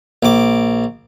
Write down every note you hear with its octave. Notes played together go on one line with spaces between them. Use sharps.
A#1 D6